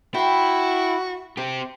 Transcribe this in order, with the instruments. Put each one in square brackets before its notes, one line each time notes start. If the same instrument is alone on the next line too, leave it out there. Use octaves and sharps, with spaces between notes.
[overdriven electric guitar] E4 [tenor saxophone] F#4 [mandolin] G5 C6
[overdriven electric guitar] C4 G4 [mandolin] C5